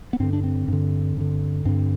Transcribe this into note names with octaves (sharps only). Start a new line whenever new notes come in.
B3
G2 D3 C4
D4
C4
G2 D3
G2 D3
G2 D3 C4